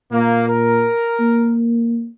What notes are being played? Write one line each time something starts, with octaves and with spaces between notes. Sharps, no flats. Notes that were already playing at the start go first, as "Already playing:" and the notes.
A#2 A#3
A#4
A#3